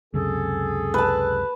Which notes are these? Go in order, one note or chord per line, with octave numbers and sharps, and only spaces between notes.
C#2 F#2 C3 G#4 A4
B4 A5